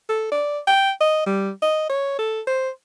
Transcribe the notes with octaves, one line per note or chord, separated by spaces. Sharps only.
A4
D5
G5
D#5
G3
D#5
C#5
A4
C5